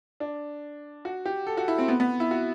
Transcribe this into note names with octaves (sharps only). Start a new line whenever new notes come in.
D4
F#4
G4
A4
F#4
E4
C4
B3
B3
E4
F#4